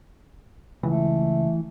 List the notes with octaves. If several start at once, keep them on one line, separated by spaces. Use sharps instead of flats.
C#2 E3 A3